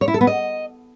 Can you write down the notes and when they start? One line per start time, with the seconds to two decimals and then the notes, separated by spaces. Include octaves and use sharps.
0.01 C#5
0.08 E4
0.14 A4
0.21 B3
0.27 D#5